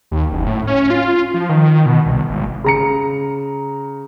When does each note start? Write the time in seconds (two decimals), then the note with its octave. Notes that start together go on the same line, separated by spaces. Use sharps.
0.11 D#2
0.32 F#1
0.47 A2
0.67 C#4
0.90 F4
1.34 F3
1.49 D#3
1.86 B2
2.06 C2
2.30 G#1
2.64 C#3 A#5 C#7